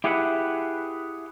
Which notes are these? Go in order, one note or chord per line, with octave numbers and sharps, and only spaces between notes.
E4 G4 G#4 B4 E5 F#5